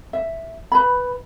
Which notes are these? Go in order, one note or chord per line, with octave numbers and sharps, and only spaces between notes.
E5
B4 B5